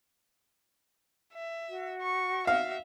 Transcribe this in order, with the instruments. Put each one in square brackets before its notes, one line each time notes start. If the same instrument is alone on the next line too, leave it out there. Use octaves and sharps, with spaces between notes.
[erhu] E5
[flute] F#4
[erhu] C#6
[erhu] E5 [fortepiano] F5